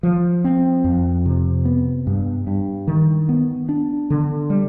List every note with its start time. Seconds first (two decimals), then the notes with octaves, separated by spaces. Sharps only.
0.03 F3
0.44 C4
0.84 F2
1.26 C3
1.65 B3
2.07 G2
2.47 G2
2.88 D#3
3.29 B3
3.69 D4
4.10 D3
4.50 G3